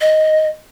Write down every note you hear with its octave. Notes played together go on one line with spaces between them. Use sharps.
D#5